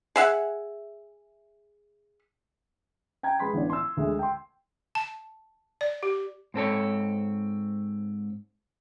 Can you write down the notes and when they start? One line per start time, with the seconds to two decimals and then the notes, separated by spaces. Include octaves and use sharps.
0.16 G#4 E5 F#5
3.23 G5 A#5 G#6
3.39 G#3 B4 B5 C6 B6
3.53 A1 D3 B3 D4 D5
3.70 C6 E6
3.97 D2 G#3 A3
4.19 G5 C6
4.95 A5
5.81 D5
6.03 G4
6.54 G#2 C4 A4 C#5